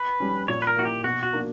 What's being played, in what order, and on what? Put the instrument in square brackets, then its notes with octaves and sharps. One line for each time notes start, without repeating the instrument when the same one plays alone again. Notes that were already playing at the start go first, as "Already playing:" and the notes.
Already playing: [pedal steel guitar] B4
[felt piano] G3 C#4
[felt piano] A#2 [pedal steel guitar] C#5
[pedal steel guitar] B4
A#4
[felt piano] A#3 E4 [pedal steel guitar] F#4
[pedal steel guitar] G4
[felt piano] B2 [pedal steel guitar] F#4
[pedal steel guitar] F#4
[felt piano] A#3 D4